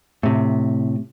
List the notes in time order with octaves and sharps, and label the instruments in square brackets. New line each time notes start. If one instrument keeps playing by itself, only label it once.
[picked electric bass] A2 C3